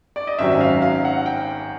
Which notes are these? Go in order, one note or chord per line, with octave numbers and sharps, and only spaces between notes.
D5
D#5
G#1 F#2 D#3 F#3 E5
F5
F5
F#5
G5